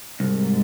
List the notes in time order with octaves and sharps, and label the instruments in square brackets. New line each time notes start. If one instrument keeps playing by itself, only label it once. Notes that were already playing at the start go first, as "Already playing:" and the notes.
[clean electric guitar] C2 [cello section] G#2